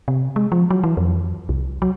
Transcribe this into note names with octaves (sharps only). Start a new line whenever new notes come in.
C3
G#3
F3
F#3
E3
F2
C2
F#3